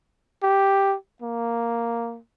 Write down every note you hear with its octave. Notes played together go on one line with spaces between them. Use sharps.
G4
A#3